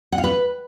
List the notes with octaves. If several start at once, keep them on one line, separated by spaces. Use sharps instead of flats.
F#5
F5
B4